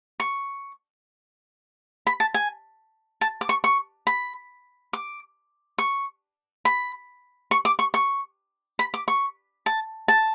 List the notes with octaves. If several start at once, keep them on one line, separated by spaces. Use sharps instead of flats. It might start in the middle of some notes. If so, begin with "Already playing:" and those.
C#6
B5
A5
G#5
A5
D6
C#6
C#6
B5
D6
C#6
B5
C#6
D6
C#6
C#6
B5
D6
C#6
A5
A5